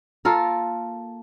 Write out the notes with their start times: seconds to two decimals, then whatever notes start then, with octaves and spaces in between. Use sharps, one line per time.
0.25 A#3 F4 A4 A#4